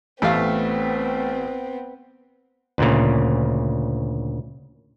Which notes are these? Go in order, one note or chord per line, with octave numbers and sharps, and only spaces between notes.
A1 A3 B3 C4 E5 F5
D2 A#2 C#3